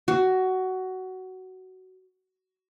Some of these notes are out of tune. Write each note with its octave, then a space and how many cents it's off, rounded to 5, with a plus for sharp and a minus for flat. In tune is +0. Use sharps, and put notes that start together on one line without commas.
F#4 +15